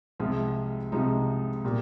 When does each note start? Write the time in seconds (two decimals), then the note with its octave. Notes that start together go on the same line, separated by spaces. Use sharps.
0.20 C2 C3 F3 G#3 F4
0.92 C2 C3 F3 G#3 D#4
1.65 A#2 G3